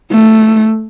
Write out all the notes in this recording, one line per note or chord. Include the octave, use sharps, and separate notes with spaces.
A3